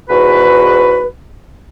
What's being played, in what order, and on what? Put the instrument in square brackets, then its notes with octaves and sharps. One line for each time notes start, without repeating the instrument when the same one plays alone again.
[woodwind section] E2 G#2 F#4 B4